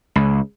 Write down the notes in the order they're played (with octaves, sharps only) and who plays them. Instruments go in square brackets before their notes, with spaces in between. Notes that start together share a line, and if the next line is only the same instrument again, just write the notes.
[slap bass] C#2